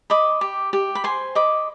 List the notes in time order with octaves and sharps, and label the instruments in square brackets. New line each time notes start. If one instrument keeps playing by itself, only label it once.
[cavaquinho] D#5 B5 D6
G4
G4
B5
C5 G#5 C6
D#5 B5 D6